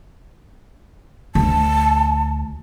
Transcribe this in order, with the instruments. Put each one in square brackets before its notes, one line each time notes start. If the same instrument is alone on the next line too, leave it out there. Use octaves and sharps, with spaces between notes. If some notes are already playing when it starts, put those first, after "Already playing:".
[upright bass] D2 D3 [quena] A5